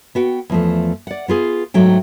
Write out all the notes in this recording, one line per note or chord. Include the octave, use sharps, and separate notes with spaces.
B3 F#4 G5
E2 F3 A3
D5 F#5
B3 F4 G#4
G#2 F#3 A3 G5